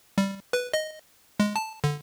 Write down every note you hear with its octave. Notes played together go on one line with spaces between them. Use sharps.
G3
B4
D#5
G#3
A5
D3